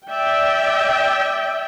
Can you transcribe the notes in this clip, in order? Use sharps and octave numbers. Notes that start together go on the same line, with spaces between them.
D5 E5 G5